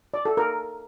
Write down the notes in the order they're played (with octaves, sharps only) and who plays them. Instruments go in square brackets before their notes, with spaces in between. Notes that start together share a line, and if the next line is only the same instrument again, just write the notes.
[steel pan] D5
A4
A#4